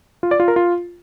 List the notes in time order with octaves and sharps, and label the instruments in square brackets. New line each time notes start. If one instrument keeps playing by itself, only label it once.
[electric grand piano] F4
D5
F4
A#4
F4